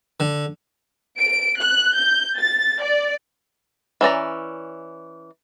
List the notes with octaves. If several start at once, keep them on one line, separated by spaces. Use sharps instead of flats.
D3
D7
F#6
G6
A6
D5
E3 C#4 D5 A#5